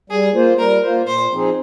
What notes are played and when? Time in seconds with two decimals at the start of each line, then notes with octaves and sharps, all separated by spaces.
0.10 G3 G#4
0.34 A#3 F4 C5
0.58 G3 A#4
0.83 A#3 F4 C5
1.07 A#2 C5
1.31 F3 C4 D#4 G#4